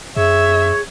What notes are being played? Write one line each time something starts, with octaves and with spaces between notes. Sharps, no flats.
F#2 G#4 C#5 E5